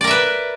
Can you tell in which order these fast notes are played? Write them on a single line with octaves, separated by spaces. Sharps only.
D5 A#4 E5 B4